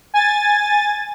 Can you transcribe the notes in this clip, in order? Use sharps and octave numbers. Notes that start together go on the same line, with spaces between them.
G#5 A6